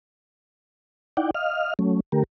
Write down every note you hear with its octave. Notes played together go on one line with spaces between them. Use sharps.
D#4 E4 D5 F#5 G5
D#5 F5 F6
F#3 A3 C#4
D3 A3 G4 A#4